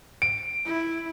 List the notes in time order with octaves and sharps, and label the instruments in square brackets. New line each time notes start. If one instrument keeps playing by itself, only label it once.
[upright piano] D7
[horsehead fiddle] E4